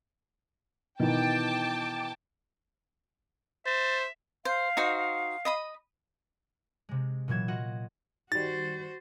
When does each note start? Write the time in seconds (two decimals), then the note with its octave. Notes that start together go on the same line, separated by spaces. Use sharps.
1.00 B2 D#3 E3 G5 A5 D6
3.66 C5 E5 A6
4.45 C5 F5
4.77 D#4 F#4 C5
5.45 D#5 B5 D#6
6.89 C3 G#3
7.28 A#2 E3 F#3 G#6 E7
7.48 F4 F#4 D#5 F#5
8.32 D#3 G3 F#4 C5 A6